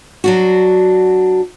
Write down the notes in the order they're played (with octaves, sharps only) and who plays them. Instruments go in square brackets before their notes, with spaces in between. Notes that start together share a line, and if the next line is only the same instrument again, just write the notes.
[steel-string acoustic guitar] F#3 D4 F#4